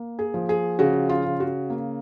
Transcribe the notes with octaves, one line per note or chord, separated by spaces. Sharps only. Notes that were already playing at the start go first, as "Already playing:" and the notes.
Already playing: A#3
G#4
F3
G#4
C#3 F#4
F4
C#3
F#4
A#3